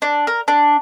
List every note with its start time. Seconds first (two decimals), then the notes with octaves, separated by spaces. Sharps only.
0.02 D4
0.27 A#4
0.48 D4